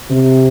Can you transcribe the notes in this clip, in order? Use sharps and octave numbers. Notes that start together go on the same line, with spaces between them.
C3